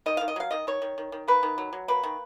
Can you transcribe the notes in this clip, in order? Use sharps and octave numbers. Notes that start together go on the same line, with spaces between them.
D#3 D#5
D#3 F5
D#5
F#3 F5
D#3 D#5
D#3 C#5
D#3
D#3
D#3
A#3 B4
D#3
F#3
F#3
A#3 B4
D#3